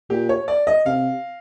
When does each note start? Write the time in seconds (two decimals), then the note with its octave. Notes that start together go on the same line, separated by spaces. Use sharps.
0.10 A#2 G4
0.29 C#5
0.48 D5
0.67 D#5
0.86 C3 F5